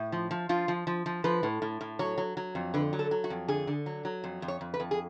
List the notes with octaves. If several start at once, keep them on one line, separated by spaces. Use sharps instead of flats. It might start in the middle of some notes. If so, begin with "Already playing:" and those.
Already playing: A2
F3
F3
F3 F4
F3
F3
F3
F3 B4
A2
A2
A2
F#3 C#5
F#3
F#3
F2
D3 B4
F#3
A4
F#3
F#4
F2
D3 G#4
D3
F#3
F#3
F2
F2
C#5
F2
B4
F2
G#4